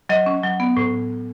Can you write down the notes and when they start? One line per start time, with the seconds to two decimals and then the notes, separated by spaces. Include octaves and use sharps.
0.09 F#3 D#5
0.26 C#4
0.43 F#3
0.60 B3
0.77 A2